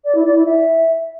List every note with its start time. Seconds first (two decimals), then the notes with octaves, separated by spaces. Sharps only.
0.04 D5
0.15 E4
0.25 D5
0.35 E4
0.45 E5